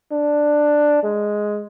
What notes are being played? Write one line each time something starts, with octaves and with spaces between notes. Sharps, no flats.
D4
G#3